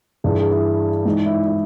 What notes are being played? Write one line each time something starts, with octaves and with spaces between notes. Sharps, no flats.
G2 E3 G#4
G#4
E4
G#2 E3 D#4
E4
E4